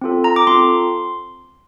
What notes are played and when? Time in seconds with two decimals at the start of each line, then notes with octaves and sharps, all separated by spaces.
0.01 C4 F4 A4
0.24 A#5
0.36 D6
0.47 C4 F4 A4 C6